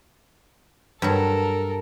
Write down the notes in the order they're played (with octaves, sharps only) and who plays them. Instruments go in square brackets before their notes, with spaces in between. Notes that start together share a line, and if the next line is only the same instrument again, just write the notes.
[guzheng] G2 F#3 [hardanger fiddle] A4 A#4